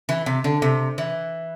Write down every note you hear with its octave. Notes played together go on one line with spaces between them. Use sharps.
E3
C3
D3
C3
E3